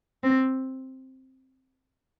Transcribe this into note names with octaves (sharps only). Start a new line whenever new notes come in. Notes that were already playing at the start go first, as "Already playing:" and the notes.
C4